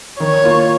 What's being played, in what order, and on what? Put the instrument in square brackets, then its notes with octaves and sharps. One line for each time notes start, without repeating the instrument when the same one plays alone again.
[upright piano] D#3 [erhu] C#5
[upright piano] A#3 F4